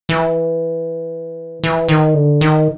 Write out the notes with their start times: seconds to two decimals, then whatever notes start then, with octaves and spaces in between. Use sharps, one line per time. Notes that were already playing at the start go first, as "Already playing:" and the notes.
0.09 E3
1.64 E3
1.89 D#3
2.14 D3
2.41 D#3